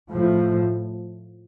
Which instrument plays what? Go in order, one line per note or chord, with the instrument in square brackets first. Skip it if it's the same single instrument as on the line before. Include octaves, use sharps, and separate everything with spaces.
[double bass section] A2 F3